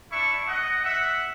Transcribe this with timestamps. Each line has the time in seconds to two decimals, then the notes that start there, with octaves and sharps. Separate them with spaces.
0.11 D4 E4 E5 C#6
0.47 D#5 F#5
0.82 E5 F#5